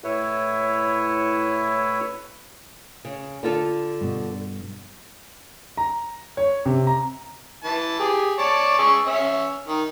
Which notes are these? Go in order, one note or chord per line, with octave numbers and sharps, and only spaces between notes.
A2 E4 B4 C#5 E5
C#3
D3 F4 A4
G2 B2
A#5
C#5
C3
A#5
E3 A5
G4 G#4
C#5 D5 A5
G#4 C#6 E6
C#4 E5
D#3